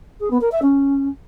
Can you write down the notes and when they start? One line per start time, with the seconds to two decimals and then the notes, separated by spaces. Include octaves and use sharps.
0.19 G#4
0.30 B3
0.40 A#4
0.51 E5
0.62 C#4